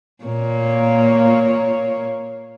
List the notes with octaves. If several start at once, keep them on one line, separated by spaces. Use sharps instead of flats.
A#2 A#3 C#5